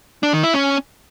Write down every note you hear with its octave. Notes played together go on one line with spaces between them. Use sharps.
D4
D#3
E4
C#4